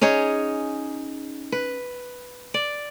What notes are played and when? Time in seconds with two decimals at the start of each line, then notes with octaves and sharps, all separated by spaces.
0.01 C#4 D#4 G#4 C#5
1.52 B4
2.54 D5